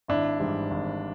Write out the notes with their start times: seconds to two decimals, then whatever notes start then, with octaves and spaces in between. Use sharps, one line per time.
0.08 G#1 D4 E4
0.39 G#2 E3 G3
0.71 G#1